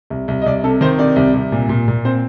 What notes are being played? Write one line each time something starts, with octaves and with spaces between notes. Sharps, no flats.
C2
C2
D#5
C2 D5
C3 A4
D#3 C5
C3 D5
C2
C2
A#2
A#2
A#2
C4 C5